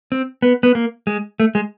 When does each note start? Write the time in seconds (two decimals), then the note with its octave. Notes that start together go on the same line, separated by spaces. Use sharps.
0.12 C4
0.42 B3
0.63 B3
0.75 A#3
1.07 G#3
1.40 A3
1.55 G#3